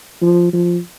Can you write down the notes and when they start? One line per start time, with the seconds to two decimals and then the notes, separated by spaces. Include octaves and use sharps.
0.22 F3
0.53 F3